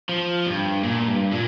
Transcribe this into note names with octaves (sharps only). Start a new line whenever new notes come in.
F3
G2
A#2
G2
A#2